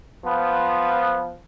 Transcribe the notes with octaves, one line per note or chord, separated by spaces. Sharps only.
F3 B3